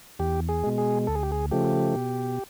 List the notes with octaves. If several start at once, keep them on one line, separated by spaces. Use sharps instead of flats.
E2 G4
G#4
B2 G#3
G#4
D2 A4
G#4
G4
G#4
C#3 F3 A3 G4
B2